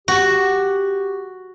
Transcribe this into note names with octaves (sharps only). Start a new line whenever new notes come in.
F#4 G4